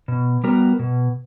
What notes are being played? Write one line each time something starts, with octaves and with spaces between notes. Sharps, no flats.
B2
G3 B3 F#4 A#4
B2